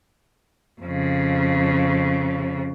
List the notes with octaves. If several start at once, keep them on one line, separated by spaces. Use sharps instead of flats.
F2 C#3